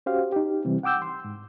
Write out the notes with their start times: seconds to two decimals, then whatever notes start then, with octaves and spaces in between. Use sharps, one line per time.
0.06 C#4 F#4 G4 C5 F5
0.32 D#4 G4
0.65 C3 E3 G3 C4
0.83 F#5 G5 D6 E6 G6
1.02 C6
1.24 G#2